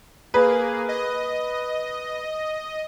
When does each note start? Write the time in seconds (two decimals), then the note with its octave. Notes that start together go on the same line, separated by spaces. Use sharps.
0.34 A#3 G#4 B4
0.89 D#5